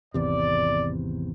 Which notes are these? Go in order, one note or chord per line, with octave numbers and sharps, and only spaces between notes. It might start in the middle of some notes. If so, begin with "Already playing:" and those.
G#1 E2 C3 D5